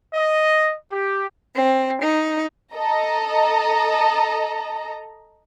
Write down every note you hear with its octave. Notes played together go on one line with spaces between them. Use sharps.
D#5
G4
C4
D#4
A4 D#5 A#5